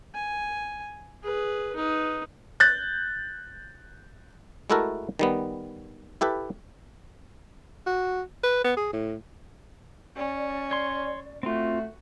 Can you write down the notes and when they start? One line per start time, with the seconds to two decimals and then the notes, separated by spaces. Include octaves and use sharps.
0.15 G#5
1.23 G#4 B4
1.76 D#4 B4
2.60 F#6 G6 A6
4.70 G#3 A3 E4 F#4 A4 A#4
5.19 D#3 G3 B3
6.21 E4 G4 A4 B4
7.86 F#4
8.43 B4
8.64 B3
8.77 G#4
8.93 A2
10.16 C#4 D5
10.71 C#5 C6
11.43 A3 C4 F4 F#4